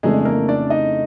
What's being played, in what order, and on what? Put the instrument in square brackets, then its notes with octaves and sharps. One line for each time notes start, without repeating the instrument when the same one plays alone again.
[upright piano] F2 C#3 E3 A3 D4 [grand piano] G#3 G#4
[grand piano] A#3 A#4
D4 D5
D#4 D#5